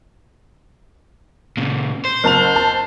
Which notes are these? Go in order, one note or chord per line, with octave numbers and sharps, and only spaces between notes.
A#2 C#3
C5
F#1 A5 F7
A5